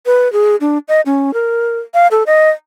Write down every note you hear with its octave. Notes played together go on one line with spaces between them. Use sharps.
B4
G#4
D4
D#5
C#4
A#4
F5
A4
D#5